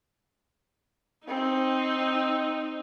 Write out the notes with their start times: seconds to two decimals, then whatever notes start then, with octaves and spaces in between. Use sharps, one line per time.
1.27 C4 D#4